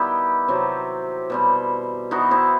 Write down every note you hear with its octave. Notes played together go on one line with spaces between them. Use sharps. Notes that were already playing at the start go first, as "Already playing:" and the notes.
Already playing: D#3 G3 B3 E4 G4
C3 F#3 C4
B2 G3 C4
E3 B3 D#4 F#4
C4 E4